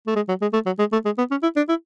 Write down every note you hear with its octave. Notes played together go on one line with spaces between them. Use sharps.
A3
G#3
F#3
G#3
A3
F#3
G#3
A3
G#3
B3
C#4
E4
D4
E4